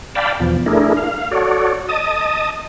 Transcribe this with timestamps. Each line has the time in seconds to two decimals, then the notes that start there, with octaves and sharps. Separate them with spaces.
0.15 D5 F5 G5 A5 B5
0.40 E2 B2 F3
0.66 A3 D4 E4 G#4 A#4
0.97 F5
1.31 F#4 A4 C#5 D5
1.89 D#5 A5 D#6